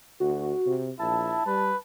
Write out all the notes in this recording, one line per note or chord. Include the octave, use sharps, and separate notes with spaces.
D2 F#4
C3
A#1 E4 A5
G3 B4